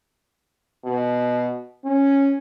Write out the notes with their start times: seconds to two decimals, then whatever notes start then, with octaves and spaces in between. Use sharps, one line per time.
0.86 B2
1.85 C#4